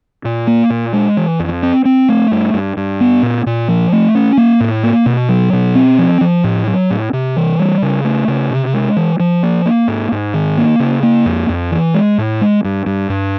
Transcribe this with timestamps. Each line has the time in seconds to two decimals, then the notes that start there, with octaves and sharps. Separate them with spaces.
0.25 A#2
0.47 A#3
0.70 A#2
0.93 G#3
1.17 E3
1.39 F2
1.63 C4
1.85 C4
2.09 A3
2.31 G2
2.54 G2
2.77 G2
3.00 B3
3.23 A#2
3.46 A#2
3.68 F3
3.92 A3
4.15 C#4
4.37 A#3
4.60 A2
4.83 A#3
5.06 B2
5.29 F#3
5.53 B2
5.75 C4
5.99 F3
6.21 F3
6.44 A2
6.67 F#3
6.90 A2
7.13 C3
7.37 E3
7.59 G3
7.82 C#3
8.05 A3
8.28 C#3
8.51 C3
8.74 G#3
8.96 E3
9.20 F3
9.43 A#3
9.66 A#3
9.88 G#2
10.12 G#2
10.34 D#3
10.58 A#3
10.80 C#3
11.03 A#3
11.26 F2
11.49 F2
11.72 E3
11.94 G#3
12.18 A2
12.41 G#3
12.64 G2
12.86 G2
13.09 G2